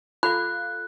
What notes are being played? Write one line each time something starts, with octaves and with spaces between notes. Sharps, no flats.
F4 A4 F5 B5 F#6